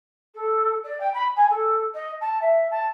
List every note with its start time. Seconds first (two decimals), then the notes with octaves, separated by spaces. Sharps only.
0.35 A4
0.84 D5
1.00 G5
1.14 B5
1.36 G#5
1.50 A4
1.94 D#5
2.21 A5
2.41 E5
2.71 A5